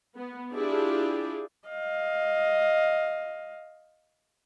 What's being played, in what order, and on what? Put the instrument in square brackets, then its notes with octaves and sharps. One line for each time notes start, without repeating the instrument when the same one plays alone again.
[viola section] B3
D4 E4 F4 G4 G#4 D5
[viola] D#5 F5